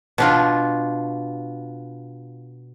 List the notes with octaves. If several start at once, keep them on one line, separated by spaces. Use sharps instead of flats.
B2 D4 F4